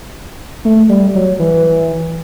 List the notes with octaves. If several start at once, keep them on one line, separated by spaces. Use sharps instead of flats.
A3
G3
F#3
E3